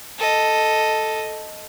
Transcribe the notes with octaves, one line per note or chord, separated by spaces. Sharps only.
A4 D#5